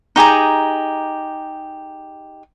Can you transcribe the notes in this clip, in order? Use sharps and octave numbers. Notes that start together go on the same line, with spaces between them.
D#4 G4 G#4 A#5